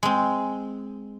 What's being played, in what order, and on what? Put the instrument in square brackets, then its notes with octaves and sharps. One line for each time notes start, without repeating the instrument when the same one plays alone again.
[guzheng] G#3 C4